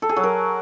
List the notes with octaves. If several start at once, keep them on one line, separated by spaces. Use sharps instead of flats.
A4
G#4
F#3
A#4